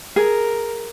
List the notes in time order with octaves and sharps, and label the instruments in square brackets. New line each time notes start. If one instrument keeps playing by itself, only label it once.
[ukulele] G#4 [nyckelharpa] A#4